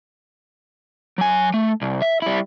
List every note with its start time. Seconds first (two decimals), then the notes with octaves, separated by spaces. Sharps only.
1.18 F#3 G#5
1.54 A3
1.82 C2
2.02 E5
2.22 G3 E4